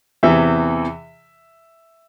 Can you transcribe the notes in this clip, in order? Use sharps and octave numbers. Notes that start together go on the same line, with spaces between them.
E2 C3 E3 E5